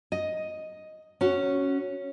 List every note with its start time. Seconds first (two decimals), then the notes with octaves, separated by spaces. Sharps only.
0.12 D#5
1.21 C#4 F#4